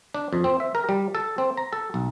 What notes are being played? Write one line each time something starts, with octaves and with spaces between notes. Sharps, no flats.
D4
F2
C4
E5
A#4
G3
A4
C4
A#5
A4
B1